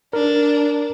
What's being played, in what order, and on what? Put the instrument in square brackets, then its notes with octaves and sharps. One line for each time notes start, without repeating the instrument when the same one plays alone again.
[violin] D4 [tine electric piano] A#4